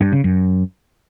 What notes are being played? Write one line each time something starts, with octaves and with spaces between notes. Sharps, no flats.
G2
C#3
F#2